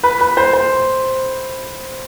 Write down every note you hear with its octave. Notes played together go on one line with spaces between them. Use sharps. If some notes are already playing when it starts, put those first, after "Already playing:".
B4
B4
C5
C5